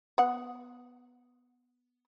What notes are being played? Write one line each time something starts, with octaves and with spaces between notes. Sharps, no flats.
B3 F#5